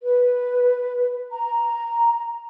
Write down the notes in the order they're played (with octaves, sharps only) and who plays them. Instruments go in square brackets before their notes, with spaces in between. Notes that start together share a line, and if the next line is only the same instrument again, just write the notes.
[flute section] B4
A#5